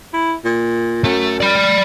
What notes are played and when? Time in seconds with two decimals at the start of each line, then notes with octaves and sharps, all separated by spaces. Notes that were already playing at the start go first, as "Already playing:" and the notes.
0.13 E4
0.45 A#2
1.04 F#2 A3
1.40 D5 B5